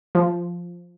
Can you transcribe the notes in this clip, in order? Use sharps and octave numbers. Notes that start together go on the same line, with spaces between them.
F3